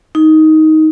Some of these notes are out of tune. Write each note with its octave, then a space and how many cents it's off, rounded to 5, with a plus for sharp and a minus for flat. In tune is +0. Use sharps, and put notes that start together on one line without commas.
D#4 +10